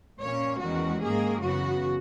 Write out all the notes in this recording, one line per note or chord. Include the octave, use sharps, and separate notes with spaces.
A#2 A#3 C#4 C#5
E2 D#3 G#3 C#4 F#4
G#2 D#3 A#3 G#4
F#2 C#3 E3 B3 F#4